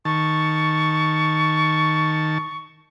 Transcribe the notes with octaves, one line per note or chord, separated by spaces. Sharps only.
D#3 A5 C#6